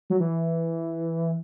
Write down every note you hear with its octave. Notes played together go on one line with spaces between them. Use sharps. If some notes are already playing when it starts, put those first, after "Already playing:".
F#3
E3